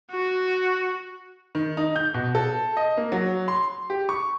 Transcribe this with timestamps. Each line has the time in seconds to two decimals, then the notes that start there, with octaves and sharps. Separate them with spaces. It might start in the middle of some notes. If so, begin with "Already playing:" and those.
0.12 F#4
1.55 D#3
1.77 D#4
1.96 G6
2.14 B2
2.35 A4
2.77 D#5
2.97 A#3
3.12 F#3
3.48 C6
3.90 G4
4.09 C#6